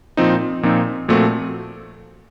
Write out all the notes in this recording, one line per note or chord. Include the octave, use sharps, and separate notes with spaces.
A#2 F3 C4 D#4
A#2 F3 C4 D#4
A#2 F3 A3 C4 F#4